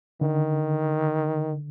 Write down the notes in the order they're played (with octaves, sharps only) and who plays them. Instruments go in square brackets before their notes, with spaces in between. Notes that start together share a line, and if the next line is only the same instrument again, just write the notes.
[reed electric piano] D3 [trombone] D#3